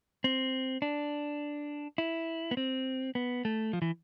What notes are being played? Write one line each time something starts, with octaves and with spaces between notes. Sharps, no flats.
C4
D4
E4
B3
C4
B3
A3
F3
E3